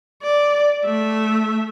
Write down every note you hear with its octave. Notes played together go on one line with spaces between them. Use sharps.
D5
A3 E5